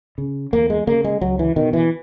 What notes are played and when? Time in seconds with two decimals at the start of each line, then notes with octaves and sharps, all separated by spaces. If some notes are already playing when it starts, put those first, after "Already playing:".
0.18 C#3
0.52 E2 A#3
0.70 G#3
0.87 C#3 A#3
1.04 G#3
1.21 C#2 F#3
1.39 E3
1.56 B2 D#3
1.73 E3